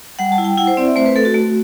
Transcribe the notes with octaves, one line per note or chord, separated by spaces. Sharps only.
G3 F#5
A5
E4
G5
E4 F#5
C5
C4 D5
E5
A3 C5
B4
A3 A4
F#4
A3